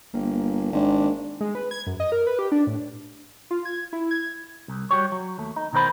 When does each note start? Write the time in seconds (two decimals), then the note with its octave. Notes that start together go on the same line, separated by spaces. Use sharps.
0.14 G1 A#3
0.72 G#1 D4
1.41 G#3
1.55 B4
1.71 G#6
1.87 F#2
2.00 D#5
2.12 A#4
2.27 B4
2.39 G4
2.52 D4
2.67 A2
3.51 F4
3.65 G#6
3.93 E4
4.11 G#6
4.68 C2
4.91 G3 F#4 G4 C#5
5.12 F#3
5.38 D#2 A3
5.56 D#4
5.73 B2 D#3 A#4 C5 B5